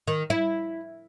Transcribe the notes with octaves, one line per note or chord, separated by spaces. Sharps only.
D#3
E4